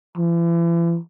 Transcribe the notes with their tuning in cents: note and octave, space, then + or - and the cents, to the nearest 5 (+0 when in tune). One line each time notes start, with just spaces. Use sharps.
E3 +40